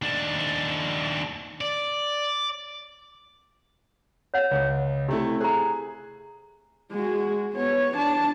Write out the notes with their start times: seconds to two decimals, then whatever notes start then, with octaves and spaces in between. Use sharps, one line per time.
0.02 D#2 D4
1.61 D5
4.34 C#5 E5 F#5
4.51 C#2 C#5
5.09 C3 A3 E4 G4
5.41 G#4 C5 A#5
6.92 G#3 F#4
7.53 B3 C#5
7.96 D4 A5